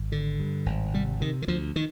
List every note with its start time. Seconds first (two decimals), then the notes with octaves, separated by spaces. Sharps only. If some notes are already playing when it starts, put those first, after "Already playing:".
Already playing: G#1
0.12 D3
0.40 G2
0.66 G#1
0.94 C3 G3
1.20 C3 D#3
1.42 D#3
1.48 D2 F3
1.76 D#3